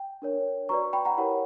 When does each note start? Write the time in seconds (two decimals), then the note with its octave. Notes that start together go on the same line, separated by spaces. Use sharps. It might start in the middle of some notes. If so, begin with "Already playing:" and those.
Already playing: G5
0.22 D4 A#4 C#5
0.69 F#4 B4 D5 A#5 C#6
0.93 G5 B5
1.05 F#5 A#5
1.17 E4 G4 A#4 C#5 F#5